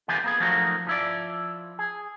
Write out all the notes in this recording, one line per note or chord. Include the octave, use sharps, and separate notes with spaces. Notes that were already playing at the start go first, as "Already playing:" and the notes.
D3 E3 B3 F4 G4 G#5
A#3 B3 G#4
F3 F#3 A3 A#3 D#4 F#4
F3 E4 D5
G#4